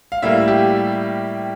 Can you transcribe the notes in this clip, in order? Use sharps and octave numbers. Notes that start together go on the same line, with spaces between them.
F5
A2 G3 A#3 E5
G4